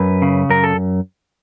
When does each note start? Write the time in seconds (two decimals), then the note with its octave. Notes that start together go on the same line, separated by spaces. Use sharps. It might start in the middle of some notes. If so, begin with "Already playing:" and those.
Already playing: F#2 B4
0.22 C#3
0.50 F#2 A#4
0.64 A4